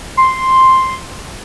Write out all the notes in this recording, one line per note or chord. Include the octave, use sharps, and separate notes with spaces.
C6